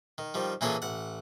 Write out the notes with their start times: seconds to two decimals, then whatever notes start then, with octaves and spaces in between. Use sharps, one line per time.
0.18 D#3
0.34 D#3 F3 G3
0.61 A#2 E3 A#3 C#4 G#4 A4
0.82 A1 F#5